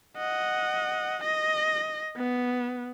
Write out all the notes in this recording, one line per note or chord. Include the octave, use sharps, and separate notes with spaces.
D#5 F#5
D#5 A#6
B3